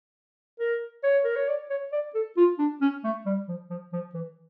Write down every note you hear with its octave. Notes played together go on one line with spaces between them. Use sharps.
A#4
C#5
A#4
C#5
D5
C#5
D5
A4
F4
D4
C#4
A3
G3
F3
F3
F3
E3